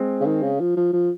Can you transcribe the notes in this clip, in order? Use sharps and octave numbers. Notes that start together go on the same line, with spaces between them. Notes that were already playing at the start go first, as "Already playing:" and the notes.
Already playing: G#3 C4
C#3
D#3
C#3
F3
F3
F3